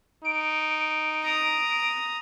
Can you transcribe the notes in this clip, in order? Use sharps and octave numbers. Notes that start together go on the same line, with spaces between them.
D#4 D7
A#5 D#6